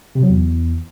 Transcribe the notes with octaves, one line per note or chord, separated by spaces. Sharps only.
C3
F#3
E2